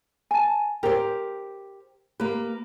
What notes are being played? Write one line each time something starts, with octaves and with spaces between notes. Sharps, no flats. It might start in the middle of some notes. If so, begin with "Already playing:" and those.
G#5 A5
G4 A#4 C5
A#3 G4 B4